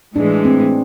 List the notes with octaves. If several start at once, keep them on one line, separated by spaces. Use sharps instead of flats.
A2 E3 G#3 D4
C4